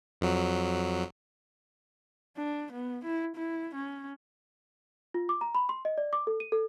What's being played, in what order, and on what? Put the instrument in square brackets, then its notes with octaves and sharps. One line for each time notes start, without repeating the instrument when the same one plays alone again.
[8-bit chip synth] F2 F#3
[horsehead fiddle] D4
B3
E4
E4
C#4
[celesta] F4
D6
A#5
B5
C6
D#5
D5
D6
A4
D#7
A4